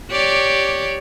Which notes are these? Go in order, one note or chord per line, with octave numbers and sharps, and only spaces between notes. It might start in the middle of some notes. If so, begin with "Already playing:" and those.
G4 C#5 D5